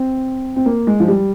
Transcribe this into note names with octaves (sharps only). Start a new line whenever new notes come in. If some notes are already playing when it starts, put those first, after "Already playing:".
Already playing: C4
C4
A#3
G#3
F3
G3